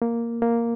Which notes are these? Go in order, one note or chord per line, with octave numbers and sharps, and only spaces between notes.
A#3
A#3